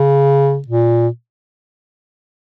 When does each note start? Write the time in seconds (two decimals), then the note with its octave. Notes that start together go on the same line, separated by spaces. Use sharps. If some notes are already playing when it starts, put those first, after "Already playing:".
Already playing: C#3
0.68 A#2